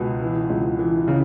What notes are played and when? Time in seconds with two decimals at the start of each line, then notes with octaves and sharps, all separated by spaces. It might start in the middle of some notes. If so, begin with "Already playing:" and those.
Already playing: C#2 B2 G#4 B4
0.22 E3
0.50 C#2
0.79 E3
1.08 C#3